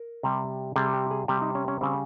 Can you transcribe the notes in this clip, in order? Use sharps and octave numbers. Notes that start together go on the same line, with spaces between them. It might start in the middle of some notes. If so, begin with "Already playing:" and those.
Already playing: A#4
C3 G3
C3 G3 G#4
G4
G#4
C3 G3 G4
D#4
C#4
C#4
C#3 G3 C4